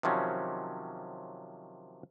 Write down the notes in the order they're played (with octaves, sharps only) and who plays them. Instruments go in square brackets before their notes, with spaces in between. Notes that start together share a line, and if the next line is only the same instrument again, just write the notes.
[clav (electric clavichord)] C3 D#3 F3 F#3 C#4